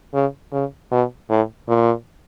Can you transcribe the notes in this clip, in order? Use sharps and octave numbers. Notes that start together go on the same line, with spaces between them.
C#3
C#3
B2
A2
A#2